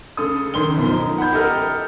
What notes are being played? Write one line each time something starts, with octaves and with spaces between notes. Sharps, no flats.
C#3 A4 D#6
D#3 C#4 C6 G7
F#2 B2 F3
D#4
F#5 B5 G6
G4 A4 A#4 D#5 F6